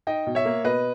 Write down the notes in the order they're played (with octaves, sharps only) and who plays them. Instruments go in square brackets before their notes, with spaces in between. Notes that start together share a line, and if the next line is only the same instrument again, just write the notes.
[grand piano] D#4 D#5 G5
B2
C#5 E5
A#3
B2 B4 D#5